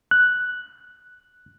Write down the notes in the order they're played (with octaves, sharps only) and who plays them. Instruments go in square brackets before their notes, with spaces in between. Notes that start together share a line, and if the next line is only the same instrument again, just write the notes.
[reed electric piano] F#6